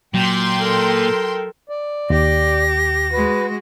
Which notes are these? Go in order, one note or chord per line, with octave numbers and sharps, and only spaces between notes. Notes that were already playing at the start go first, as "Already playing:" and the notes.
A#2 F#3 G5 C6
A4 A#4
D5
D#2 G4 A#6
G#3 F#4 B4